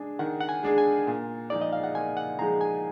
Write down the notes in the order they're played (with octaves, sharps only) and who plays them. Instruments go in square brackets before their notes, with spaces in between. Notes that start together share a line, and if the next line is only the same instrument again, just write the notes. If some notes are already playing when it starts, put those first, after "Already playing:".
Already playing: [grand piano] G#3 D4 G#4 [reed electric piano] G#5
[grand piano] D#3 [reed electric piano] F#5
[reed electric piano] F#5
G#5
[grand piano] G#3 D4 G#4
[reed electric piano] G#5
[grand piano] A#2
[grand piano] F3 G#3 D#4 G#4 [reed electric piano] D5
[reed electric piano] D#5
F5
F#5
[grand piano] A#2 [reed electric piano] G#5
[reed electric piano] F#5
[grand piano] F3 G#3 D#4 G#4 [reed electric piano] A#5
[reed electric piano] G#5